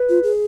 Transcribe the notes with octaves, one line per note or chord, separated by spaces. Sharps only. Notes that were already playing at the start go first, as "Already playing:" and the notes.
Already playing: B4
F4
G#4